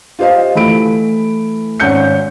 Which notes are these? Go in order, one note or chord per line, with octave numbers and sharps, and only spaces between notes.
F4 G4 C5 D#5 F5
E3 A3 B5 D7
G#1 C#4 F#5 G6 C#7